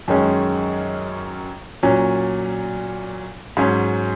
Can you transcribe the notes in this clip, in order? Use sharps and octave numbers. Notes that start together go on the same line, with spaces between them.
F#2 D#3 G#3 C#4
A#2 F#3 C#4
G#2 F#3 C#4